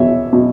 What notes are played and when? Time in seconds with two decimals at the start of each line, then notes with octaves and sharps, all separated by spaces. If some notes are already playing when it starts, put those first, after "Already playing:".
Already playing: E2 B2 C#5 E5
0.33 B2